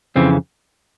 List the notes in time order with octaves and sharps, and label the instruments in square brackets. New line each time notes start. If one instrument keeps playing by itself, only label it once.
[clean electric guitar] F2 C#3 E3 C4